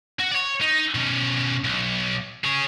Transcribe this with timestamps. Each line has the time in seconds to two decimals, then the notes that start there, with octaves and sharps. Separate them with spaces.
0.20 F#4
0.32 C#5 D5
0.61 D#4
0.95 B2 C#4
1.64 B1
2.44 G#4 C#5